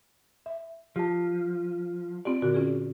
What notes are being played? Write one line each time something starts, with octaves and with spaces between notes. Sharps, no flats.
E5
F3 G4 A5
C4 F4 G4 D5
A#2 D3 F#4
C#4 F4 G#4